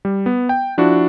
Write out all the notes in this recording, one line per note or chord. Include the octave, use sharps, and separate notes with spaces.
G3
B3
G5
F3 D4 E4 F#4